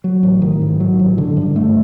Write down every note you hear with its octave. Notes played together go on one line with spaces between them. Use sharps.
F#3
A1
D#3
G#2
F#3
A1
D3
G2
A3